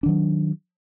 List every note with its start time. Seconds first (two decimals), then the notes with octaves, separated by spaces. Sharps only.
0.03 D4
0.06 D#3
0.08 F#3